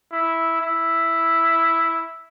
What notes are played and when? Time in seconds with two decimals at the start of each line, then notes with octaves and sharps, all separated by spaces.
0.12 E4
0.61 E4